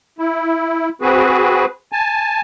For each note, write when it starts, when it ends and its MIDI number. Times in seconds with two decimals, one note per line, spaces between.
0.19 0.89 64
1.01 1.65 60
1.01 1.65 66
1.01 1.65 68
1.01 1.65 71
1.92 2.41 80
1.92 2.41 81